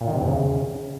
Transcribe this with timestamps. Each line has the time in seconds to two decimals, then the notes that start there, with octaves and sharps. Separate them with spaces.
0.01 A#2
0.08 D#3
0.14 C3
0.21 E2
0.28 C#3